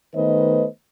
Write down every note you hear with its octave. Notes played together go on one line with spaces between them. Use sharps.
D#3 A3 B3 B4 C5 D#5